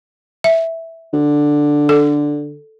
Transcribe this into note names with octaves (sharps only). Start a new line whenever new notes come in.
E5
D3
A4